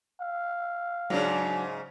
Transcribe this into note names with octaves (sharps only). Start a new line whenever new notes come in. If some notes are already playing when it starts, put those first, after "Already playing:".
F5
G#2 C#3 F#3 D4